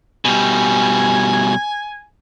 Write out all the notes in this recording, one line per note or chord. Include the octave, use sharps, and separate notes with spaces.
B2 G3 G#5